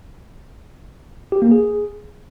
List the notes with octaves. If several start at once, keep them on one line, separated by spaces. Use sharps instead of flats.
G4
A#3
G#4